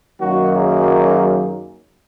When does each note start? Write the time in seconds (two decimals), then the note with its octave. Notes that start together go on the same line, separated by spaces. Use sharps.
0.21 F#2 D#3 F#3 A#3 F#4
0.54 G#4